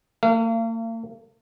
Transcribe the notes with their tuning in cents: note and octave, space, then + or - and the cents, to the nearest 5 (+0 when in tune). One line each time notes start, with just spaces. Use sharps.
A#3 -45 F5 -35